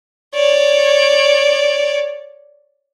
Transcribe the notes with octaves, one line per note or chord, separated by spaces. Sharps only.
C#5 D5